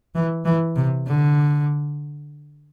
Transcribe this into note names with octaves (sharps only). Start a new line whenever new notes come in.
E3
E3
C3
D3